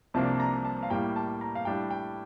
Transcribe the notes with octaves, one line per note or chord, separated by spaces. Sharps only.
C2 C3 F3 A#3 D4 A5
A5
A#5
A5
F5
A2 G3 A#3 G5
A5
A#5
F5
A2 G3 D4 G5
G5